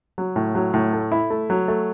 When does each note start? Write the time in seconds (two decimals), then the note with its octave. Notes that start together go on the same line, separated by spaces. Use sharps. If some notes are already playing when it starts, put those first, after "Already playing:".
0.18 F#3
0.36 A2
0.55 F#3
0.74 A2
0.93 A3
1.12 E4
1.30 A3
1.50 F#3
1.68 A3